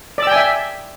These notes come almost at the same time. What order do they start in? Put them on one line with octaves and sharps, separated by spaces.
D5 E6 G5 G#5 E5